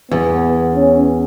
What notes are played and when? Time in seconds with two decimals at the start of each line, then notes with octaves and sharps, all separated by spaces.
0.11 E2 B3
0.74 C#4